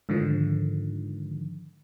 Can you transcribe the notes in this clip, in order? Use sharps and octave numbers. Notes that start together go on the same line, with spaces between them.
G#2 D3 D#3 F3